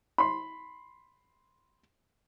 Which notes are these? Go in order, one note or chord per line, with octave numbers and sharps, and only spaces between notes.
B5 C6